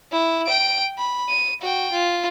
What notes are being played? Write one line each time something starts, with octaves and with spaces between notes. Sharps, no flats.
E4
G5 D7
B5
D#7
F#4 G5
F4